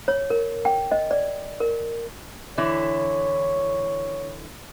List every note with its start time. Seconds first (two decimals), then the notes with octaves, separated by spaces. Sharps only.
0.08 C#5
0.30 A#4
0.65 G5
0.91 D#5
1.11 D5
1.60 A#4
2.58 D3 E3 E4 C#5